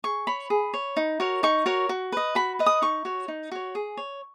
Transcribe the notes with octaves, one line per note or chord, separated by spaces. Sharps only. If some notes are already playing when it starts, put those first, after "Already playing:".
G#4 C#6
C#5 B5
G#4
C#5
D#4
F#4 A#4 C#5
D#4 C#6
F#4 A#4 C#5
F#4
B4 D#5
F#4 B5
B4 D#5
D#6
D#4 C#6
F#4 C#5
D#4
F#4 C#5
G#4
C#5